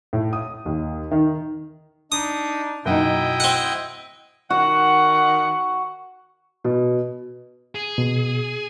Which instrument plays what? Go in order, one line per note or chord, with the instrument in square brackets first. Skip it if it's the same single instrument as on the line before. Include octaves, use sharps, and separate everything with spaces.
[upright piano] A2
D#6
D#2
D#3
[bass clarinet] D4 [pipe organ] D#4 [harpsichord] D#6
[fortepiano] F#2 D#4 [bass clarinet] B2 [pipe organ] E4 D#5 G5
[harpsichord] C4 F#5
[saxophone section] D#3 F#5 [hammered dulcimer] F#4
[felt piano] B2
[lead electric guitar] G#4
[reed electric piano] B2